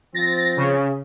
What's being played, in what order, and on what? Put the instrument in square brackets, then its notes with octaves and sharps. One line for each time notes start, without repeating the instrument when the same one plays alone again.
[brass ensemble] F3 C4 [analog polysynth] A6 A#6
[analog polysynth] C#3